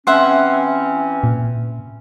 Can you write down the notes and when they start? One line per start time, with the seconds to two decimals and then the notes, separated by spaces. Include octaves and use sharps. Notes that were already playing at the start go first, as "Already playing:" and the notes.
0.07 E3 C4 C#4 E5 F#5 C6
1.24 A#2